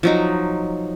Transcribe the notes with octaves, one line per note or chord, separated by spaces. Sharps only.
F3 F#3 D#4